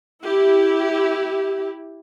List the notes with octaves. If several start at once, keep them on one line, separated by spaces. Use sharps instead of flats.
E4 G4